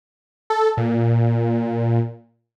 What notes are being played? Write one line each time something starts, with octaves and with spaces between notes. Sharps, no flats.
A4
A#2